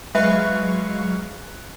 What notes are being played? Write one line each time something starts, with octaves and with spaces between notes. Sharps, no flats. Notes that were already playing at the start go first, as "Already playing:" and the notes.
F#3 G#3 B4 E5 F5 C#6